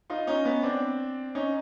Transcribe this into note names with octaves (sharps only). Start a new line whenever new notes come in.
D#4 F4
C#4 D#4
B3 C#4
C4 D4
C#4 D#4